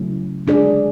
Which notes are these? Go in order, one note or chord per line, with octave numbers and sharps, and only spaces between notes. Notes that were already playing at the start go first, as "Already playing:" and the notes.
Already playing: C#3 F#3 A3 C#4 E4
G#3 D4 G#4 D5